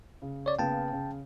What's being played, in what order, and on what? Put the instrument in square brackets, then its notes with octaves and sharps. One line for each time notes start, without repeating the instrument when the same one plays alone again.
[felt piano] C#3
[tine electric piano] C#5 D5
[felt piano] C#3 A#3 B3 [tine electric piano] G5 A5
[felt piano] C#3